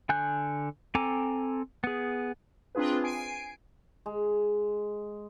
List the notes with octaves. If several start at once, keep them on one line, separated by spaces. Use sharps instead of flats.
D3 G#5 F#6 G6
C4 A4 G#5 A#5 D6
B3 G#4
C4 D4 F4 G#4 B4
G#5 C7 D7
G#3